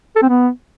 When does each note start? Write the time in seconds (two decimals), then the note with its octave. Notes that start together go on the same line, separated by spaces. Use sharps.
0.16 A4
0.23 C4
0.29 B3